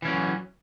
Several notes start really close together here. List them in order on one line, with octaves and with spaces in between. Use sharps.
E3 C#4 F#3